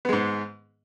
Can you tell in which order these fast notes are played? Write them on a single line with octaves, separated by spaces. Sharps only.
B3 G#3 G#2